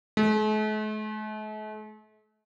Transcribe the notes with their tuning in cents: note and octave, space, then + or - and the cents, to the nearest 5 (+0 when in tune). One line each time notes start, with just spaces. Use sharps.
A3 -45